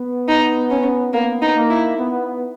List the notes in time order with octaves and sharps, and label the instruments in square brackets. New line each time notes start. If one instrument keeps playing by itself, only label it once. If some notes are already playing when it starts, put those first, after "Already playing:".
Already playing: [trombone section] B3
[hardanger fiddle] D#4
C#4
[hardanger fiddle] A#3 [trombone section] B3
[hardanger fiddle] D#4
[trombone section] A#3
[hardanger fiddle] E4
[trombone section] B3